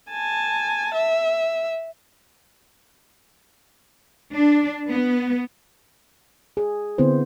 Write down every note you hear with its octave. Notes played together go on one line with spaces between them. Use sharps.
G#5 A5
E5
D4
B3
G#4
D3 B3 C4 E4 C5